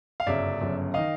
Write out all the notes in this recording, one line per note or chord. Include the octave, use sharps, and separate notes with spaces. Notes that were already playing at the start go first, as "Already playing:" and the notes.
F5
G1 F#2 C#3 F#3 D5 E5
G1 F#2 C#3 F#3
D#3 D#5 F5